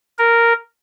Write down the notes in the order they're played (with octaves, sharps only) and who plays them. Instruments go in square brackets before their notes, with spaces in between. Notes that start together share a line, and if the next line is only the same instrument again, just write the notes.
[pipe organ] A#4